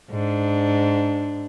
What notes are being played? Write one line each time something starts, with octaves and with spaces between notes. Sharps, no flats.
G#2 D4